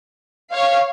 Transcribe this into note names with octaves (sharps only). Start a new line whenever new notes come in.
C#5 F5